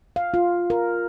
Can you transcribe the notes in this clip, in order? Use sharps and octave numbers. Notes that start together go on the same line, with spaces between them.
F5
F4
A#4